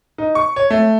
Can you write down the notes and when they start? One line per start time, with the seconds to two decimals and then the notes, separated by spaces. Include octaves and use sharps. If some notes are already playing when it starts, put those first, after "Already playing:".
0.18 D#4
0.35 C#6
0.56 C#5
0.70 A3